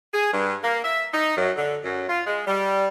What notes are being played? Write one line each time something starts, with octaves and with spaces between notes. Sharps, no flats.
G#4
G2
A#3
E5
D#4
F#2
D3
F#2
F4
G#3
G3